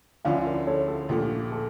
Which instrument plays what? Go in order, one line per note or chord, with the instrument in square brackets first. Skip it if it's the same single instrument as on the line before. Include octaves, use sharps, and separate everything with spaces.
[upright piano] D2 D3 F3 C#4 E4 [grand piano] D5 F5
[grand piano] A#4 D5
A4 C#5
A4
[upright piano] A#1 A#2 F3 A3 [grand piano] G4
[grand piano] A4